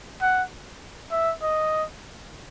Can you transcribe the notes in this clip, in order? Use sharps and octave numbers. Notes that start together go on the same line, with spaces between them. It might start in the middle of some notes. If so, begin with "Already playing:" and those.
F#5
E5
D#5